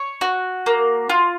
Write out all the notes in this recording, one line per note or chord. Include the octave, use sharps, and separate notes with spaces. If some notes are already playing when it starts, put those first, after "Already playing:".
Already playing: C#5
F#4
A#3
F4